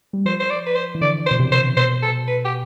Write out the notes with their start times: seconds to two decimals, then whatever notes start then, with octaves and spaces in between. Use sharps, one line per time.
0.13 G3
0.25 F3 C5
0.40 C5
0.50 D5
0.66 B4
0.75 C5
0.95 E3
1.01 D3 D5
1.27 C5
1.31 B2
1.40 C3
1.52 C5
1.76 B2 C5
2.02 A4
2.28 B4
2.45 G4